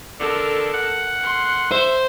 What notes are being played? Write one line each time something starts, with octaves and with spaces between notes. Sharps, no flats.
D3 A4 A#4
F#5
C6
C5 E5